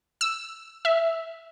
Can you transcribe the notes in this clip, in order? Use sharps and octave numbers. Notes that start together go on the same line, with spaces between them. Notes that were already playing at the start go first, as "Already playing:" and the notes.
E6
E5